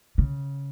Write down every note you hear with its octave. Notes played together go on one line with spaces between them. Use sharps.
C#3